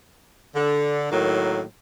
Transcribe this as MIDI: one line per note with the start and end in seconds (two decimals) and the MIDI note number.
0.55 1.07 50
1.11 1.63 45
1.11 1.63 51
1.11 1.63 54
1.11 1.63 58